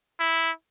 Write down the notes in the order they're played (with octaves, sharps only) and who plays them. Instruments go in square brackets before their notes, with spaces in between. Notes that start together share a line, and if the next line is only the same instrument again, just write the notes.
[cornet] E4